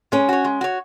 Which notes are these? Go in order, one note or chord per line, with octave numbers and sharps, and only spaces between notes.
G#3 C#4
F#4 C#5
G#3
F#4 C#5